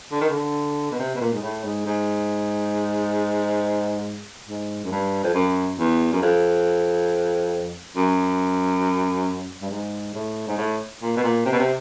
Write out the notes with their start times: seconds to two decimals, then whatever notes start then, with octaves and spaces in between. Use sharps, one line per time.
0.12 D3
0.21 D#3
0.29 D3
0.92 B2
0.99 C3
1.15 B2
1.21 A#2
1.33 G#2
1.42 A2
1.64 G#2
1.86 G#2
4.48 G#2
4.84 F#2
4.91 G2
5.24 F2
5.34 F#2
5.79 E2
6.13 F#2
6.22 F2
7.96 F#2
9.62 G2
9.71 G#2
10.14 A2
10.48 G#2
10.58 A2
11.02 A#2
11.17 B2
11.23 A#2
11.46 C3
11.52 B2
11.59 C3